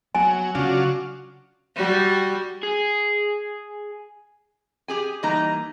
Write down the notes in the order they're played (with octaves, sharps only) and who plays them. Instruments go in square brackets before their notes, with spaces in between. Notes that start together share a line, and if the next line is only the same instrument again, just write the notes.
[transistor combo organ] F#3 [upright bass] B3 [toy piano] G#5
[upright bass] C#3 C#4 [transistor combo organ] F#3 D4 F4 [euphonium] F#4
[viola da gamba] G3 F#4
[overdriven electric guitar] G#4
[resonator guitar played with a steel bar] G4 G#4 G#5
E3 G3 A#3 D#4 A#5